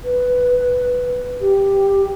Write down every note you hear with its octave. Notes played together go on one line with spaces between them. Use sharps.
B4
G4